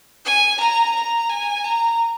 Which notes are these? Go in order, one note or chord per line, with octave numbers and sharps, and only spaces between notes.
G#5
A#5
A#5
G#5
A#5